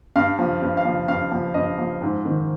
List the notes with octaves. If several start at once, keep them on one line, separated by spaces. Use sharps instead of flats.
G2 F5
F3
G2
F5
F3
G2 F5
F3
G2 D#5
F3
G#2
D#3